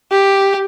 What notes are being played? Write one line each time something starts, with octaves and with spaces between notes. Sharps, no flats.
G4